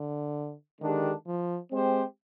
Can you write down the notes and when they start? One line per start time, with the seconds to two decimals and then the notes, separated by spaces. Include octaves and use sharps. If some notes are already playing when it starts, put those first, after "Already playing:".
Already playing: D3
0.81 D3 D#3 G#3 D4 G4
1.27 F3
1.72 G#3 C4 G4 C5